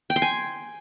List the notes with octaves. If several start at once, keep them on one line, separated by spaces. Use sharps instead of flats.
G5
C6
G#5